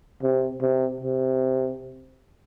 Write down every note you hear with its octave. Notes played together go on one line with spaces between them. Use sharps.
C3
C3
C3